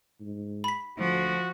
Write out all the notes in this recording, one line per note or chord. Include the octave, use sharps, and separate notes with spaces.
G#2
B5 B6
D2 F3 F#4